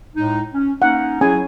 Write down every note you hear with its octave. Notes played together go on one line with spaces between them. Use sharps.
A2 G#3 D#4
C#4
A#3 C#4 D#4 F#5
F#3 C#4 E4 G#4 G#5